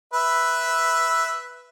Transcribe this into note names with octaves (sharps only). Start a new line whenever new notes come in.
B4 E5